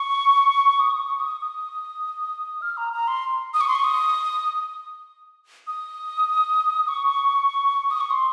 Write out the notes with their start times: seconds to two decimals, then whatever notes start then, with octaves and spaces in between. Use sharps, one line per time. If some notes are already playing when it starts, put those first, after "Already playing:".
Already playing: C#6
0.80 D#6
1.00 C#6
1.20 D#6
1.41 D#6
2.62 F6
2.77 A#5
2.93 A#5
3.08 C6
3.54 D#6
3.61 C#6
3.68 C6
3.75 C#6
3.84 D#6
5.67 D#6
6.88 C#6
7.91 D#6
8.00 C#6
8.10 C6